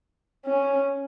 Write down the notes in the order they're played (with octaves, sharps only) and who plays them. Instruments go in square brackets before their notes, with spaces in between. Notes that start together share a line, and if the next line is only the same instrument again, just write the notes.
[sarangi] C#4